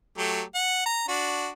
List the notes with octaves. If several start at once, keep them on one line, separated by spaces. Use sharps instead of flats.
F#3 A3 G4
F#5
A#5
D4 F#4